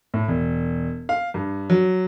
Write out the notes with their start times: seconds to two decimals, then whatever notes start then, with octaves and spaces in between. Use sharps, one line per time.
0.14 A2
0.28 E1
1.09 F5
1.34 G2
1.70 F#3